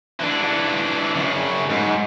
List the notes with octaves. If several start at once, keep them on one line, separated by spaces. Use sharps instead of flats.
E3 D4
F#2 C#3
G#2